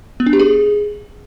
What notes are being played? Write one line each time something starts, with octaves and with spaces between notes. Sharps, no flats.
B3
D4
G4
G#4